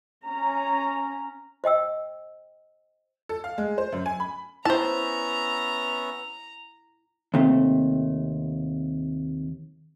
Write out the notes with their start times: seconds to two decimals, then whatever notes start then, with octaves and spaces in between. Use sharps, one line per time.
0.25 C#4 A#5
1.64 C5 D#5 G5 E6
3.29 A4
3.44 F5
3.58 G#3
3.78 C5
3.93 F#2
4.06 G#5
4.20 B5
4.65 B3 C#4 E4 C5 E5 A5 A#5
7.34 D#2 C3 A3